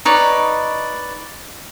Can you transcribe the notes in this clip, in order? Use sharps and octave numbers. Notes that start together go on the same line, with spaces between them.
D#4 B4 C#5 D5